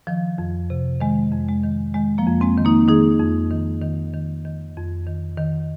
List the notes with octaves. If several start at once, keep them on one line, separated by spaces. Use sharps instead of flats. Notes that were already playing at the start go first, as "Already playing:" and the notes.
D#3 F3
F2
C3
D#3 G#3
F2
G#3
D#3
D#3 G#3
F3 A#3
F2
G#3 C4
D#3
A#3 D#4
D#3 D#4 G#4
F2
D#3
D#3
D#3
D#3
F2
D#3
D#3